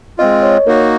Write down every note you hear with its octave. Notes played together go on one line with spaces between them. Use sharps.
G#3 C4 F4 D#5
C#5
A#3 D#4 F#4 A#4